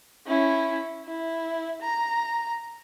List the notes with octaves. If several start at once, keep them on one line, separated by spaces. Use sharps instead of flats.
C#4 E4
E4
A#5